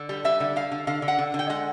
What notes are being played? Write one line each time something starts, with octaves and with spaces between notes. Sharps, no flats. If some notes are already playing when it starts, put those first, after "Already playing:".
Already playing: D3
G3
G3 E5
D3
D3 F5
D3
D3 F5
D3
F#5
D3
D3
G5
G#3 F#5